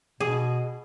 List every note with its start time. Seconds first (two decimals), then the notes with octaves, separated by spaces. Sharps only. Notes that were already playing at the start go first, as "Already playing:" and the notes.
0.20 B2 G#4